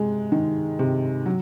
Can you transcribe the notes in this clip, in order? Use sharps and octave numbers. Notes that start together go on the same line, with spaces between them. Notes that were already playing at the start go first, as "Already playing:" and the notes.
Already playing: C3 G#3
D#3
C3
F#3